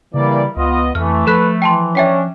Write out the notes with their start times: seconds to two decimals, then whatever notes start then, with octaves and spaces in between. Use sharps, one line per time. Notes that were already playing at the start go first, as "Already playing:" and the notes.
0.14 C#3 E3 G3 A#3 D5
0.57 C#2 B3 F4 D#5
0.95 F2 E3 A3 F6
1.27 F3 A4 B4 F#6 B6
1.62 E3 G5 A5 C6
1.95 C#4 D4 E5 G5 B6